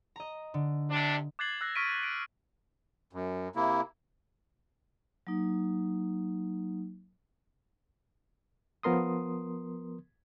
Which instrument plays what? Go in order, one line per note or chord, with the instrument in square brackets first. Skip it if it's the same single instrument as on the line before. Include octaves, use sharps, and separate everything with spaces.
[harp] D#5 A#5
D3
[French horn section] C3 D4
[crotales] D6 F#6 G#6 A6 C7 F#7
E6 F#6 A#6 C7
C#6 F6 B6 D7 D#7
D7
[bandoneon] F#2
C3 A#3 E4
[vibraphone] F#3 A#3 D#4
[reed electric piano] F3 B3 A#4 C6 D#6